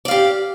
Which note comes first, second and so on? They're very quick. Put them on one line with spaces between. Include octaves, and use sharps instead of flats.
D5 F5 G4